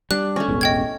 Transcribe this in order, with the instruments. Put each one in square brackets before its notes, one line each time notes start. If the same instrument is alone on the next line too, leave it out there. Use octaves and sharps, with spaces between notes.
[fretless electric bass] G3 [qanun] D4 [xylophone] F#6
[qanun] A3 C#4
[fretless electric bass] E1 A1 E2
[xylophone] D#5 G5 G#6